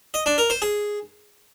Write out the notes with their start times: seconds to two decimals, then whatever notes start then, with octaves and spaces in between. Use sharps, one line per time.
0.14 D#5
0.26 D4
0.38 A#4
0.50 C5
0.62 G#4